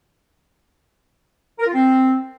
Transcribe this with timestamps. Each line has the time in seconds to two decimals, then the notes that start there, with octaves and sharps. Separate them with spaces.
1.59 A#4
1.66 F4
1.74 C4